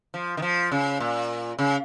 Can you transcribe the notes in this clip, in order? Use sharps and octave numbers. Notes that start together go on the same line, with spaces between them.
F3
D#3
F3
C#3
A#2
C#3